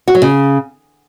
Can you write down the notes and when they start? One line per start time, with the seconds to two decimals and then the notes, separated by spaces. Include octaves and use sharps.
0.08 F#4
0.15 F#3
0.22 C#3